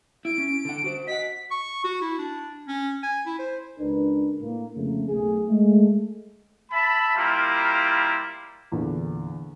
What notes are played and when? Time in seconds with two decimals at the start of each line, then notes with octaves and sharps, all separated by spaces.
0.25 E4 D7
0.38 C#4
0.65 D3 F#5
0.84 F#4 C5
1.07 D#5 F#5 B6
1.51 C#6
1.84 F#4
2.01 E4
2.18 D4
2.68 C#4
3.03 G#5
3.26 E4
3.39 C5
3.79 C#2 D4 A#4 B4
4.40 A2 A#3
4.75 F2 C#3 A3 A#3
5.08 B1 A3 G#4
5.47 G#3 A3
6.71 E5 A5 B5
7.16 G3 A#3 E4 F4 A#4
8.72 E2 A#2 D3